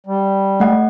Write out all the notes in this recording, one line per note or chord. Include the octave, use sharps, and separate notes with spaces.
G3
A3 F#5